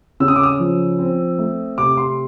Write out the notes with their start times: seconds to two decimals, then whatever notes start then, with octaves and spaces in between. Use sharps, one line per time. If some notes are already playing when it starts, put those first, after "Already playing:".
0.20 C#3 E6
0.28 D#6
0.36 D6
0.43 D#6
0.59 F3
0.99 C4
1.39 A3
1.78 C3 D6
1.97 C6